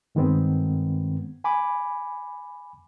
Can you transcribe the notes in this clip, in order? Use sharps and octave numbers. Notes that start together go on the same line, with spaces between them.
G2 D#3 G#3 B3 C4
G#5 B5 D6